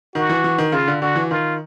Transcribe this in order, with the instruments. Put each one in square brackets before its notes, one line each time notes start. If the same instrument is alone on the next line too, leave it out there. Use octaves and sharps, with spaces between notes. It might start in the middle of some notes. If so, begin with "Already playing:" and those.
[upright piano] D#3 [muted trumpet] F#4
[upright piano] E3
E3
D#3
[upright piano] C#3 [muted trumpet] F4
[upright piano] D3
[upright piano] D3 [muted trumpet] F#4
[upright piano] E3
[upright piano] D#3 [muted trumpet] F4